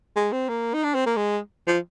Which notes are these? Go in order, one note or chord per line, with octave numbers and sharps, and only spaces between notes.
G#3
C4
A#3
D#4
D4
C4
A#3
G#3
F3